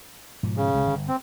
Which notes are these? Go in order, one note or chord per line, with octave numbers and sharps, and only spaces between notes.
G#2 B2 F3
C#3
C2 G#3
G1
C4